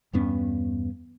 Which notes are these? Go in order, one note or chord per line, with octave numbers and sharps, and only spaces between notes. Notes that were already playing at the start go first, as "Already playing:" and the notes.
E2 G2 B3 C#4